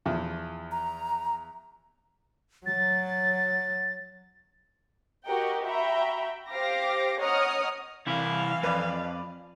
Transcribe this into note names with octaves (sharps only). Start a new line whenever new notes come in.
E2 F3
A#5
F#3 A6
F#4 G4 A#4 D#5 F#5 G5
F#4 E5 G5 A#5 B5
G4 C5 F5 D6 A#6
C#5 D#5 F#5 A#5 D#6 F6
C2 E3 E4 F5
F2 B4 D5 B5